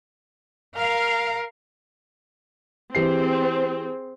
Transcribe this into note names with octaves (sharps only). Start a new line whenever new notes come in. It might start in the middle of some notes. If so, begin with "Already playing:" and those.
A#4 F5
E3 C4 G4 G#4 C7